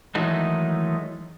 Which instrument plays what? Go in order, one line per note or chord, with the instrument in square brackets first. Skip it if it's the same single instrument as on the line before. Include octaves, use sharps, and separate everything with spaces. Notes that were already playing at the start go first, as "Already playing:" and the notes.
[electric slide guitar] D#3 E3 F#3 G#3 A3 D#4